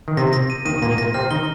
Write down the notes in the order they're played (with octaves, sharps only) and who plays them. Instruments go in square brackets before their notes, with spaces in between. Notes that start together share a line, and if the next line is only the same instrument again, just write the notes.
[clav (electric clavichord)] D#3
[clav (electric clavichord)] C3 [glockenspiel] A#6
[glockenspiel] A#6
D#7
[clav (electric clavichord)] D#2 D#3 [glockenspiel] D#7
[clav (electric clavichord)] A#2 A#3 [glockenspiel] A#6
[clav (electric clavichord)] A#2 A#3 [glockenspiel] A#6
[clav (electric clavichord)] C3 C4 [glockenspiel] F6
[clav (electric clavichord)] D#3 D#4 [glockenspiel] G7